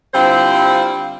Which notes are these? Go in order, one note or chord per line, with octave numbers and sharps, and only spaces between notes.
D3 G3 C4 E4 F4 C5